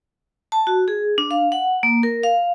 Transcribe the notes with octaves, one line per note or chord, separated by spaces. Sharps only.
A5
F#4
G#4
D4
F5
F#5
A#3
A#4
F5